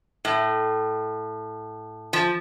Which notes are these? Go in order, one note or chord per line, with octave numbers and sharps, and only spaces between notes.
A2
F3